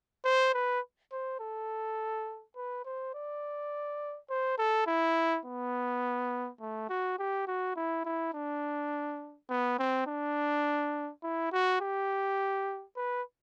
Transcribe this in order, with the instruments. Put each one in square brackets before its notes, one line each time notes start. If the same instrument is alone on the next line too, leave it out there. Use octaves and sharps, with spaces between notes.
[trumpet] C5
B4
C5
A4
B4
C5
D5
C5
A4
E4
B3
A3
F#4
G4
F#4
E4
E4
D4
B3
C4
D4
E4
F#4
G4
B4